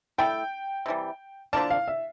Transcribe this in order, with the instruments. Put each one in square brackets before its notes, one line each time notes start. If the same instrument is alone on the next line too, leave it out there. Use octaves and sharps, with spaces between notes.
[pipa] A3 E4 A4 [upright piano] G5
[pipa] C3 E3 G3
[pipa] D3 F3 A#3 D4 [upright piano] A5
[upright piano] F5
E5